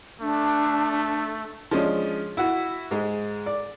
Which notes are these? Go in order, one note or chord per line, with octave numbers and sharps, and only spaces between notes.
A3 D4
F3 G#3 C#4 D4
E4 F#4
G#2 G#3
D5